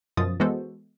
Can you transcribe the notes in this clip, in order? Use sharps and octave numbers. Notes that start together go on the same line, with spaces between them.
F#2 B2 F3 F4 D#6 A6
E3 G#3 B3 F#4 A4 C5